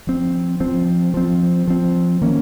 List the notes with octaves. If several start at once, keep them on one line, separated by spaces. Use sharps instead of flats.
F3 C4
F3 C4
F3 C4
F3 C4
D#3 A#3 C#4